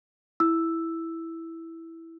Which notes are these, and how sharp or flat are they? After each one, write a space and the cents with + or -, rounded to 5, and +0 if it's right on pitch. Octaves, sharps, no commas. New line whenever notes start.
E4 +0 E6 +0